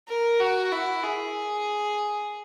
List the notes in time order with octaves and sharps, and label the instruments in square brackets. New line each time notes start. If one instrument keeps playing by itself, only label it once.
[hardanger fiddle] A#4
F#4
E4
G#4